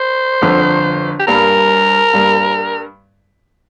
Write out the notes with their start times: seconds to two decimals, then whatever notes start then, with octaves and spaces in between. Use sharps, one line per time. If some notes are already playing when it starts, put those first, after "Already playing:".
Already playing: C5
0.42 G1 F2 D3
1.19 G4
1.27 G2 G3 A#3 A#4
2.13 G2 G3 A#3